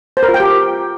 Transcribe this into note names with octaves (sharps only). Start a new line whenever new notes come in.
C5
A#4
F4
G5
G4